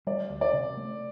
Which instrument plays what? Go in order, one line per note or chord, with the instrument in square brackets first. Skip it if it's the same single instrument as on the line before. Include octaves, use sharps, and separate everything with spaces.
[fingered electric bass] G3 [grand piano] D5
[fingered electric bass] D2
[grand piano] D5
[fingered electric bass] C3
A3